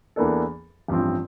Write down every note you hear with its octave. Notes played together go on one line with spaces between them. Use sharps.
E2 E3 A#3 D4 A4
A1 G2 F3 C4